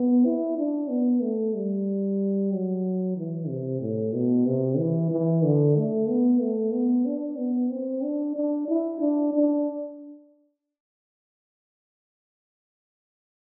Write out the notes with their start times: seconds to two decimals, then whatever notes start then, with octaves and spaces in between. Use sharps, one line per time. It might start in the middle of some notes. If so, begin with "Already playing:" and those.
Already playing: B3
0.25 E4
0.57 D4
0.89 B3
1.22 A3
1.54 G3
2.52 F#3
3.17 E3
3.48 C3
3.81 A2
4.14 B2
4.46 C3
4.78 E3
5.11 E3
5.44 D3
5.77 A3
6.09 B3
6.41 A3
6.73 B3
7.06 D4
7.38 B3
7.70 C4
8.03 D4
8.36 D4
8.68 E4
9.00 D4
9.34 D4